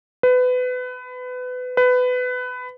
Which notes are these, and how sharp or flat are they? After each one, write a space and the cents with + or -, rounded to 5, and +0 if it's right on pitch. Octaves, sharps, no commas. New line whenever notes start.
B4 +25
B4 +20